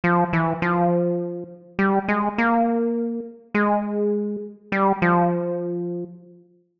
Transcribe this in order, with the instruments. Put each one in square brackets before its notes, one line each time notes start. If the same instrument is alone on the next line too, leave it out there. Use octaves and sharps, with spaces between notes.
[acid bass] F3
E3
F3
G3
G#3
A#3
G#3
G3
F3